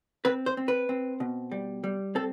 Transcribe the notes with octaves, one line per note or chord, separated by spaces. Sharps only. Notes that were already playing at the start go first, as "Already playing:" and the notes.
C4 B4
C5
C4
B4
C4
B2
G3
G3
C4 A4